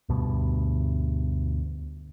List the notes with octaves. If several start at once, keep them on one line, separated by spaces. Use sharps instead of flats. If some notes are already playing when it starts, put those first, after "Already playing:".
D2 G2 B2